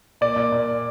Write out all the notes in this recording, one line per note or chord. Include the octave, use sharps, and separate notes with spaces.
A#2 D5
A#2
A#2